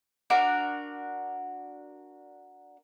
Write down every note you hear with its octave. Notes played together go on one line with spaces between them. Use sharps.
D4 F#4 A#4